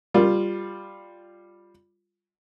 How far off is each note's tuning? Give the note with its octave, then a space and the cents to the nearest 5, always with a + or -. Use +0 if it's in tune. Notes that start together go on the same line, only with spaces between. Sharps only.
G3 +5 F4 +0